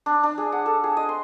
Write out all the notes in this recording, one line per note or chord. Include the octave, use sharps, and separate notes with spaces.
D4
D4
G#4
F#5
A4
G#4
D#5
C6